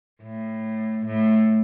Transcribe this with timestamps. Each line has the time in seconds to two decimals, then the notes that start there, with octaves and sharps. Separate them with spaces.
0.22 A2
1.05 A2